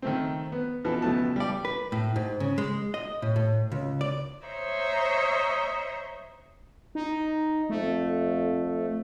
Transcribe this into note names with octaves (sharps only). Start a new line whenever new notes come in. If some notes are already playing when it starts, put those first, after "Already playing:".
D#3 A3 C4
B3
B2 E3 F3 A4
C#2 B2 A3 B3 A5
G3 D5
B4
A2
G#2
C#3
G#3
D#5
A2
A2
C#2
D5
C5 C#5 D#5 E5 A#5
D#4
F2 A3